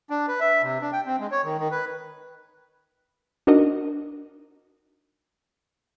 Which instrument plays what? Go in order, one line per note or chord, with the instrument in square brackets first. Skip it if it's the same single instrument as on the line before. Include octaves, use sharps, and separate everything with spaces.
[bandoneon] D4
B4
E5
C3
D4
G5
C4
G#3
C#5
D#3
D#3
B4
[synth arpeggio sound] D4 D#4 F#4 A#4 D#5